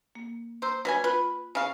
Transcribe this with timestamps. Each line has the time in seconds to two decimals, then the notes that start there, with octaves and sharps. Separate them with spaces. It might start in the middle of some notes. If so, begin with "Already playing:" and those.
0.15 A#3
0.62 C5 A#5 E6
0.85 F#3 G3 B4 G#5
1.04 F4 B4
1.55 C#3 F5